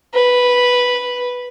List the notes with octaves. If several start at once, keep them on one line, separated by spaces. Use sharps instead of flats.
B4